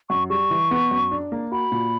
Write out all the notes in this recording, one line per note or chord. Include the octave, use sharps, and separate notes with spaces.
F#2 C#6
G3 C#6
E3
B3
F#2
D4
A#3
F#4 B5
A#2